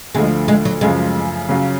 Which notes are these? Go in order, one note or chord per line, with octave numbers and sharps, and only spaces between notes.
D2 D3 F3 G#3
G#3
F#3
F#2 C#3 F3 G#3
C#3 F#3 C#4 F4